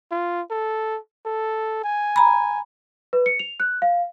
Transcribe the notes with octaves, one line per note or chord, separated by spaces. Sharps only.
F4
A4
A4
G#5
A#5 B5
B4
C#7
F7
F#6
F5